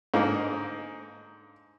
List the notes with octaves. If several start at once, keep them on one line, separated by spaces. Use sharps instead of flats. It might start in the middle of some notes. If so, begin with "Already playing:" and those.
G#2 D3 A#3 D#4